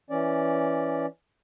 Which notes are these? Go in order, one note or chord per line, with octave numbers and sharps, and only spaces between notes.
E3 C#4 D5